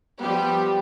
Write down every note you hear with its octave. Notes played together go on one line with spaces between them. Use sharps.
F3 G3 B3 G4